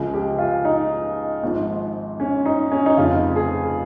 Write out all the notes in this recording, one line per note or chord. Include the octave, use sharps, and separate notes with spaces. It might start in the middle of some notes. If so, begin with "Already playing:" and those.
Already playing: C#2 C#3 F3
G4
F4
D#4
G#1 G#2 F3
C#4
D#4
C#4
D#4
F1 F2 C#3 F3 F4
G#4